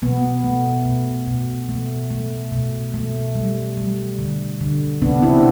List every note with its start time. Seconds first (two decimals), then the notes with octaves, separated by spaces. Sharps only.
0.02 B2 B3
0.44 A3
0.85 B2
1.28 B2
1.69 A3
2.11 A3
2.52 B2
2.94 A3
3.35 G3
3.77 G3
4.19 D3
4.61 D3
5.02 C3 B3 D4
5.23 C4 E4